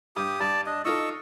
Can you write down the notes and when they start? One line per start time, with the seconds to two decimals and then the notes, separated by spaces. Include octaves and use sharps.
0.16 G2 G4 D#6
0.40 G2 D5 A5
0.66 D4 D#5
0.85 D#4 F4 A4 D#5 C#6 E6